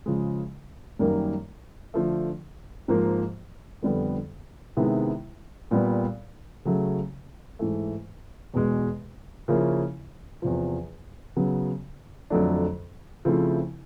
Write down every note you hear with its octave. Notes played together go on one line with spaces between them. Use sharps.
C#3 F3 G#3
F#2 D#3 G3 A#3
D3 F3 A3
G#2 F3 A#3
F2 D3 G3 B3
C3 D#3 G#3 B3 E4
A#2 G3 B3
C#3 F#3 A3
G#2 E3 A3
E2 B2 G#3
C#3 F3 A#3 C#4 E4
E2 C3 F3
C#3 F#3 B3
F2 D3 F#3 A3 D4
C#3 F3 A3 C4 E4